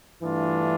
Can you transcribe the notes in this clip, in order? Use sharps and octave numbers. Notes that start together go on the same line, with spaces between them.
G2 E3 A3 D4 F4